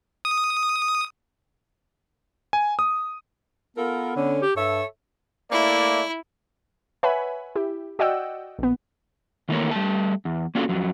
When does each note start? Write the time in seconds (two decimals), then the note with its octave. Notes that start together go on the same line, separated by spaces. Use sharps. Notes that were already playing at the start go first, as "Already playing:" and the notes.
0.25 D#6
2.53 G#5
2.79 D#6
3.77 B3 F4 A4 A#4
4.16 D3 C#4
4.41 G4
4.57 G2 A4 C#5 E5
5.51 A3 A#3 E4 D5
7.03 B4 C#5 E5 F#5 G#5 B5
7.55 E4 G4
7.99 F#4 D5 D#5 F#5 G5 E6
8.59 A#1 B3
9.49 D#3 E3 A3 A#3 A#4 C#5
9.71 G3 A3 A5
10.25 E2
10.55 A#3 C#4 D4 F4 F#4 A4
10.69 F2 F#3